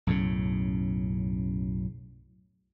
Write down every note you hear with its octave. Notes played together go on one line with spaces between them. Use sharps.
B1 F#2 A2 C#3